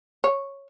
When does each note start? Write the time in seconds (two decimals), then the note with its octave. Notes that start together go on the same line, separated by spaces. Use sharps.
0.24 C#5